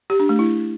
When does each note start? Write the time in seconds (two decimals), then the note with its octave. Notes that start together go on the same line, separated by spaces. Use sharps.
0.10 G4
0.20 D4
0.29 A3
0.39 E4